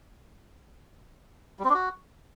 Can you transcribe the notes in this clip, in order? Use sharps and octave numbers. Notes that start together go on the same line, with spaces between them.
G3
C4
D4
F#4